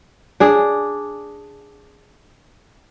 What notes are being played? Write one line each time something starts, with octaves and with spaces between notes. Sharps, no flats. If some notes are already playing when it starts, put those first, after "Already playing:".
D4 G#4